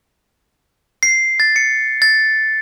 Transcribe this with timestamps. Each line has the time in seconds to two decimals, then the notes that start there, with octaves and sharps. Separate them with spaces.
1.03 C7
1.40 A6
1.56 C#7
2.02 A6